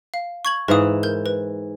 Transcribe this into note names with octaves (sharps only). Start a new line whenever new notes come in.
F5
C#6 G#6 F#7
G#2 E3 B4 F5 D#6
A#4 G6
B4